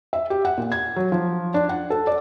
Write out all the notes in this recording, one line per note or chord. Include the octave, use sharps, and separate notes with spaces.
E5
G4
F#5
A#2
G#6
F#3
F3
D4
F#5
A4
D5